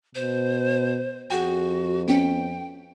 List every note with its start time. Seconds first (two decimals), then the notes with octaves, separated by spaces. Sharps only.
0.15 B2 C5
1.30 F2 F#4 G#4 F#5 G5
2.08 B3 C#4 G5